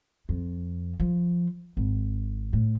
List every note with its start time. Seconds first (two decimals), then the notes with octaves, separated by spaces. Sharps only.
0.29 F2
1.00 F3
1.77 G#1
2.53 A2